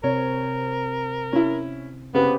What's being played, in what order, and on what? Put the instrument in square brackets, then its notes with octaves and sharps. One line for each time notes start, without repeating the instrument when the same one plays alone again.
[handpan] C3 C4 [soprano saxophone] A#4 [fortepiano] C#5
[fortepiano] C#4 E4
[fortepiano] C#3 [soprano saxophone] B3 [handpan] C4 G4 B4